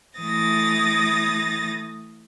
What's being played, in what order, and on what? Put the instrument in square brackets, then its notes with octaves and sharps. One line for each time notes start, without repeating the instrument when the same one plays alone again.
[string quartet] E3 A3 D#6 A6 A#6